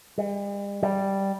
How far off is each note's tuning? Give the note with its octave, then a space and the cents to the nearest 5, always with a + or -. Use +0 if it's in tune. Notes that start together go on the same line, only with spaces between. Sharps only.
G3 +45
G3 -5